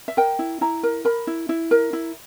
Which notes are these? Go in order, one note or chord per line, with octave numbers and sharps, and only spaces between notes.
E5
A#4 G5
E4
E4 A#5
A#4
A#4 B5
E4
E4
A#4
E4